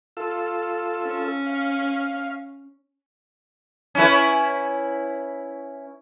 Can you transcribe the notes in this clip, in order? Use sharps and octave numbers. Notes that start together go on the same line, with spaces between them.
F4 A4 E6
C#4
F5
C#4 E4 B4